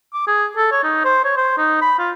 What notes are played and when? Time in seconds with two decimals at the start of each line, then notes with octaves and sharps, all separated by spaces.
0.14 D6
0.27 G#4
0.57 A4
0.72 C#5
0.84 D#4
1.05 C5
1.24 C#5
1.37 C5
1.58 D#4
1.81 B5
1.99 F4